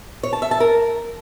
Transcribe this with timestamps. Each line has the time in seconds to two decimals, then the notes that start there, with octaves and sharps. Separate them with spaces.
0.23 C#5
0.33 A5
0.42 E5
0.51 A5
0.60 A#4